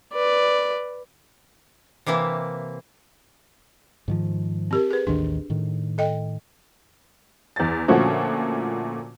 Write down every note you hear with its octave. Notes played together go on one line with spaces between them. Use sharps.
B4 D5
C3 E3 A#3 E4
G#2 D#3 F3
C4 G4 A#4
G#4 B4
A1 D#2 D#3 D4
A2 D#3
A4 D#5 G5
E2 A6
A#2 D3 F3 A3 C#4 F#4